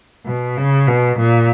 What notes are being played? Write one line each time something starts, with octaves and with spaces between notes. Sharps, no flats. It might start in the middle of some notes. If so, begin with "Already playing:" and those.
B2
C#3
B2
A#2